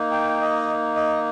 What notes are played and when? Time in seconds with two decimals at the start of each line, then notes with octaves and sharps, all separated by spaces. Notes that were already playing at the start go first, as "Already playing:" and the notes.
Already playing: A#3 D#4
0.11 G5
0.42 D#5
0.96 D#5